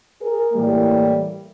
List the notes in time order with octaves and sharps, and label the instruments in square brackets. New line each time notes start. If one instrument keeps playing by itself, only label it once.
[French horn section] G#4 A#4
A2 E3 G3 A#3